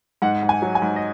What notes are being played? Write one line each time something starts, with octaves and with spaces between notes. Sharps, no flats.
G#2 F#5
G#2
G#5
F#3
G#5
G#2
D#5